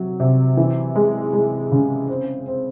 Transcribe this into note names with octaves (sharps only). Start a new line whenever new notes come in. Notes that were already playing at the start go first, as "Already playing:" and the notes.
Already playing: C3 F#3
C3
E3
G#3
G#3
C#3
C4
C4